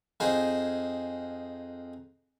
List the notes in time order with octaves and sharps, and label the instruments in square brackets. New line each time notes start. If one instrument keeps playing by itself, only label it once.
[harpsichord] F2 D#4 G#4 C5